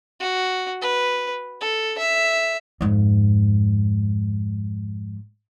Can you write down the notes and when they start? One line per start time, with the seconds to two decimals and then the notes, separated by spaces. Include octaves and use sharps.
0.20 F#4
0.81 B4
1.61 A4
1.98 E5
2.81 F2 G#2